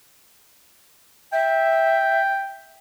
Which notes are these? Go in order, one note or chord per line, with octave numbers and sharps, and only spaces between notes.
E5 G5